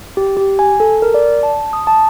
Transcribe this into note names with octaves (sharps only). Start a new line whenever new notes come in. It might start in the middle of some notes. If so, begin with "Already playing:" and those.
G4
G4
G#5
A4
A#4
D5
A5
D#6
A5